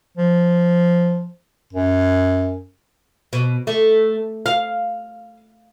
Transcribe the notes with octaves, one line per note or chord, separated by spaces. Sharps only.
F3
F#2
B2
A3
F5